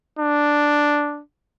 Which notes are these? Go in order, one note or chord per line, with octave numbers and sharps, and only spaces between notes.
D4